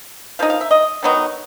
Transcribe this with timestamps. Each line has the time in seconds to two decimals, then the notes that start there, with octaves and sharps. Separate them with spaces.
0.39 F3 A#3 D#4 F5
0.50 F5
0.61 E5
0.71 D#5
1.03 D#3 F#3 B3 D#4